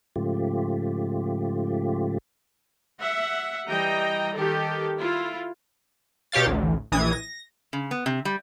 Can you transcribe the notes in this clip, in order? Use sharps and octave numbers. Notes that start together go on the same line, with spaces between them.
G#2 C#3 F3 A3 F4 G4
E5 F#5
E3 G3 D#5 G5 A#5
D#3 G4 A4
E4 F4
B2 G4 C#5 F5 A6
A1 D2
A#1 E3 D#6 G#6 D#7
A#6
C#3
B3
C3
G3